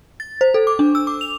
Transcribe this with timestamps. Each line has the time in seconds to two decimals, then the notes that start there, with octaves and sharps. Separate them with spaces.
0.20 A6
0.41 C5
0.54 A4
0.67 D6
0.79 D4
0.95 E6
1.07 D6
1.21 F7